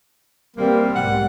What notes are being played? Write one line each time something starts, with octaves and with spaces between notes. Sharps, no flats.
E3 G3 A#3 C4
B1 G#2 F#5